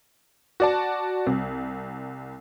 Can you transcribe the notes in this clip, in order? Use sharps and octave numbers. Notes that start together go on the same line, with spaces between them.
F#4 D5 A5
C2